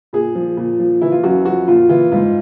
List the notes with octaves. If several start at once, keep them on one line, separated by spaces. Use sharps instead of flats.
A#2 G#4
F3
A#2
F3
E3 E4
F4
F#2 F#4
F3 F#4
A#2 F4
E3 F4
G#2 F4